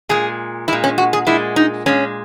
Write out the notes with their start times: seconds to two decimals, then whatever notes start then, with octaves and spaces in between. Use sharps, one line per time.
0.09 A#2 G#3 G#4
0.68 A#2 G#3 E4
0.84 C#4
0.98 F#4
1.13 G#4
1.27 A#2 G#3 E4
1.56 D#4
1.86 A#2 G#3 C#4